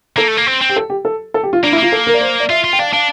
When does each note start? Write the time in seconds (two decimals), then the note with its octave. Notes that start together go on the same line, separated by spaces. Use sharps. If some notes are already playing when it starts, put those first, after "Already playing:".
0.17 A#3 A4
0.28 A3
0.37 A#3
0.47 C4
0.62 C4
0.69 G4
0.76 A4
0.90 G4
1.05 A4
1.34 A4
1.43 G4
1.53 F4
1.63 A#3 D4
1.72 E4
1.78 A#3 F4
1.92 A4
2.07 A#4
2.14 D5
2.21 C5
2.40 D5
2.50 F4 E5
2.64 F4
2.73 G5
2.79 D4 F5
2.93 D4 F5